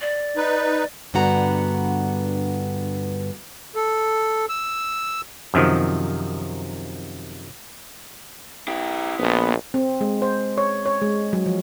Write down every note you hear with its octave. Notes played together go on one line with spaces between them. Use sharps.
D5
D#4 B4
G2 D3 B3 F#4 F#5 A#5
A4
E6
F#2 C3 D#3 F3
E4 G4
A#1 B3
C4
G#3
C5
C#5
C#5
G#3
F#3
F3